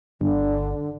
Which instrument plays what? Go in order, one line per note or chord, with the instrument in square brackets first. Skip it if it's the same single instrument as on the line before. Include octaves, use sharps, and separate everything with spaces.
[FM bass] G1 [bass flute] D3 [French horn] D4